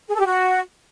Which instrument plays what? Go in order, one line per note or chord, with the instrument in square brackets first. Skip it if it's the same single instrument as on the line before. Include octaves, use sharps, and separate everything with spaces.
[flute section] G#4
A4
G4
F#4